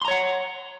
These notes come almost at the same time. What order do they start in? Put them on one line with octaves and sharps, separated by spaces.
C6 A#5 C#5 F#5